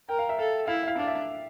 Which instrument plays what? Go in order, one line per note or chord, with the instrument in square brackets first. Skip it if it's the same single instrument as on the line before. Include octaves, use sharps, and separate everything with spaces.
[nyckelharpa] A#4 [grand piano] G5
[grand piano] F5
E5
[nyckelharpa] A4 [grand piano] F5
[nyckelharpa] E4 [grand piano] F5
[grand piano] E5
F5
[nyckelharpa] D4 [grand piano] F5
[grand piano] E5